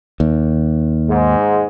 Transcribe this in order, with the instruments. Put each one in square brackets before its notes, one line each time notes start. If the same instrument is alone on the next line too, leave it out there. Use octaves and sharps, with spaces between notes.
[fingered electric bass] D#2
[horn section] G#2